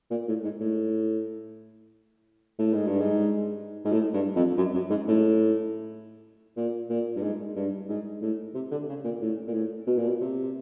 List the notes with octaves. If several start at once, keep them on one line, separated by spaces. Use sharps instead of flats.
A#2
A2
G#2
A2
A2
G#2
G2
G#2
G#2
A2
G2
F2
F#2
F#2
G#2
A2
A#2
A#2
G2
G#2
G2
G#2
A2
C3
D3
C#3
A#2
A2
A#2
A2
B2
A#2
B2
C3